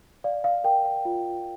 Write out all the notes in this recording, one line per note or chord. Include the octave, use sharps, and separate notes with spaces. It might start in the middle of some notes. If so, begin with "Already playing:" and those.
D5 F5
F5
A#4 G5
F5
F4